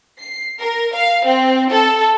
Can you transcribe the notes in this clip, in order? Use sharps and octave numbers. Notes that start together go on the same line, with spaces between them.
C7
A#4
F5
C4
A4